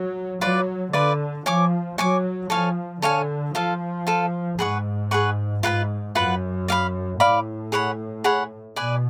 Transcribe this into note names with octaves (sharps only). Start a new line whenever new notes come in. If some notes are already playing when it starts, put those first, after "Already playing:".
Already playing: F#3
F#3 F4 B4 D5
D3 F4 B4 D5
F3 C#5 G#5 D6
F#3 C#5 G#5 D6
F3 A4 C#5 F5 G#5
D3 A4 C#5 F5 G#5
F3 F4 A4 F5
F4 A4 F5
G#2 G#4 B4 F#5 C#6
G#4 B4 F#5 C#6
G#2 F4 B4 F#5 B5
F#2 F4 B4 F#5 B5
D5 F5 B5
A2 D5 F5 B5
G#4 C#5 F#5 B5
G#4 C#5 F#5 B5
B2 B4 D5 G#5